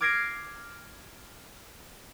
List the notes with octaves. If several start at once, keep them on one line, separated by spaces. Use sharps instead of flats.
D6 F6 G#6 A#6 C7 D7